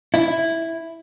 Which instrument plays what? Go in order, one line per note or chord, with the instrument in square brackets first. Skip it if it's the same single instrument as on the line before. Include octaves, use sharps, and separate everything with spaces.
[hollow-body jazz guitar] E4